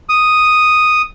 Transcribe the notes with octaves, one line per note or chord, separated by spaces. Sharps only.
D#6